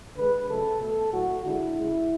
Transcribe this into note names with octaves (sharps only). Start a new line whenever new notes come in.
D3 G#3 B4
C#3 F#3 A3 A4
B2 A3 A4
A2 F#3 A3 F#4
D3 G#3 E4
C#3 G#3